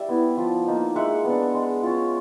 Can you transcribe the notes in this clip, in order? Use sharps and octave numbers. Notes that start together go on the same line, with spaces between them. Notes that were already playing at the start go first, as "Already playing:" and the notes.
Already playing: G3 D5 E5
B3 E4
F3
A#3 D#4
G#3 E5 F#5
B3 D4
G#3
C#4 F4